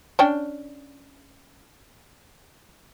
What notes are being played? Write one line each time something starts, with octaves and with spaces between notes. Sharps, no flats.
C#4 D4 G5